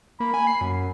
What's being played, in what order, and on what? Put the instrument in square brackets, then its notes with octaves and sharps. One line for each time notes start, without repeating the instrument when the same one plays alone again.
[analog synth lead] A#3 [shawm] B5
[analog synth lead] G#5
C7
F#2